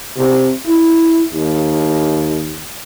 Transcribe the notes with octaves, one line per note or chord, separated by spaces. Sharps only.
C3
E4
D#2